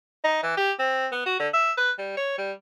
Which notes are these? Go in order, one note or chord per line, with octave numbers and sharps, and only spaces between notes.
D#4
E3
G4
C4
B3
F#4
D3
E5
B4
G3
C#5
G3